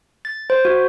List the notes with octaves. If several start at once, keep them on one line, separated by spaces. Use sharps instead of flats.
A6
C5
F#4